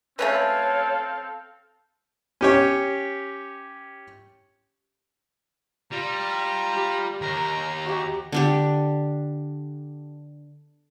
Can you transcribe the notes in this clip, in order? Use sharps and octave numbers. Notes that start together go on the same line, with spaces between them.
A3 C4 C#4 A4 B4 C#5 F5
C#4 G4 C#5
G3 F4 A#5
G4
D#2 A#4 A#5
F#4 G4
D3 D4 G4